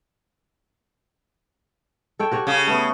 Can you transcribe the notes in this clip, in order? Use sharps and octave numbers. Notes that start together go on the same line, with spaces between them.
A4 C#5 G5
F#4 G4 C#5
C#3 C#4
A3 B3